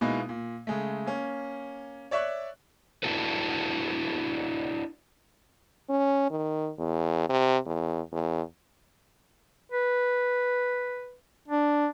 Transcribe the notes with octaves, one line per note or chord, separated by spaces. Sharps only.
B2 G#3 A#3 B3 D#4 E4
A#2
C#3 G#3 A3
A#3 C#4
C#5 D5 E5 C#6 F#6
D4 E4 F#4 A4 B4
C#4
D#3
E2
C3
E2
E2
B4
D4